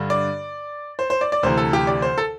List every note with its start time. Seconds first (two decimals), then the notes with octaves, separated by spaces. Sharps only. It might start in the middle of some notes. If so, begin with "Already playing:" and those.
Already playing: G2 D3
0.10 D5
0.99 C5
1.10 C5
1.21 D5
1.32 D5
1.43 D2 C3 E3 C5
1.57 A4
1.73 G4
1.87 D5
2.02 C5
2.18 A4